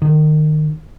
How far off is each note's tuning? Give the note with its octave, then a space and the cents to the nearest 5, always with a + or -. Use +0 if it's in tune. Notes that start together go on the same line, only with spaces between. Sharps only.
D#3 -25